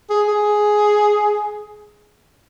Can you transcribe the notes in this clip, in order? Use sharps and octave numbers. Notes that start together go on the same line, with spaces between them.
G#4
G#4